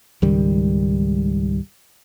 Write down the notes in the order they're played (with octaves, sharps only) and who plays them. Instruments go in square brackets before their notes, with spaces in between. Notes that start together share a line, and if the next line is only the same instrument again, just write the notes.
[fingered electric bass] C#2 G#2 D#3 G3